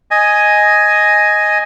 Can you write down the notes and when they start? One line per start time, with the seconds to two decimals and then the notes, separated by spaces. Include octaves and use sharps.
0.11 D#5 G#5